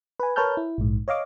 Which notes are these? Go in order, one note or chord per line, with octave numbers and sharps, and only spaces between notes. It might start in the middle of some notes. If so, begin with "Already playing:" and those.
B4 G#5
A#4 B4 C#5 A5 F6 G6
E4
A#1 G#2
C#5 D#5 F5 D6